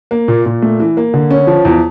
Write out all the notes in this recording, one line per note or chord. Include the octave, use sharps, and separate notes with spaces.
A#3
A#2
A#2
A3
E3
A#3
D3
C#4
F3
E2